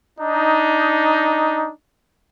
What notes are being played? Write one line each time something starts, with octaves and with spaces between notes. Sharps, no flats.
D4 D#4